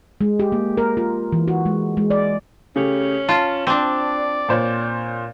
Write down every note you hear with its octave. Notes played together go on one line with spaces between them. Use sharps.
G#3
G4
A#3
A#4
F4
E3
F#4
G#3
G#3
D5
C#3 A3 C#4 G4
F4 A5
C4 D4 D5
A#2 C5 C#5